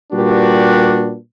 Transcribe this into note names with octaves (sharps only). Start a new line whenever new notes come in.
A#2 G3 D4 F#4 G4 B4